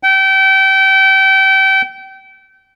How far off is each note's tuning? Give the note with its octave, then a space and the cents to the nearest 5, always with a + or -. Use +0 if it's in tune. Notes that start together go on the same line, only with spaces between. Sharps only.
G5 -30